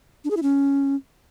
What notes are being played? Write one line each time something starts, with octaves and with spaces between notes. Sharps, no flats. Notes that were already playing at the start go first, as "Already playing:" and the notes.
D4
G#4
E4
C#4